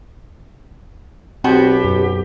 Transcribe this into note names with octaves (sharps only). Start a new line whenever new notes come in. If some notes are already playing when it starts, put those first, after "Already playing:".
B1 B2 C4 F#4 G4 C5
F#2